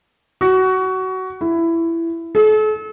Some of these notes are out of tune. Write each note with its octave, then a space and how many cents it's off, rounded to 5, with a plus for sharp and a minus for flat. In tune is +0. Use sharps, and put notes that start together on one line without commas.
F#4 +20
E4 +15
A4 -40